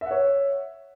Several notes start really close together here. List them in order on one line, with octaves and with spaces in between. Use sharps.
E5 F#5 C#5